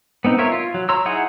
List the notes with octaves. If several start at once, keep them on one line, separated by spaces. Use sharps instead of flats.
B3 C4 D#4
F4 A#4 C#5 E5
F4
F#3
C#5 A#5 C6 E6
D#4 E4 G#4 F#5